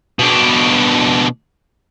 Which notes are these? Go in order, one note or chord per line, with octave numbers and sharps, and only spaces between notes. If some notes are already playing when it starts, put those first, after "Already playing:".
B2 D4